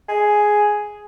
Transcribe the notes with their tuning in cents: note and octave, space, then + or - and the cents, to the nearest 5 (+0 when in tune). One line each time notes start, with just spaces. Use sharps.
G#4 +5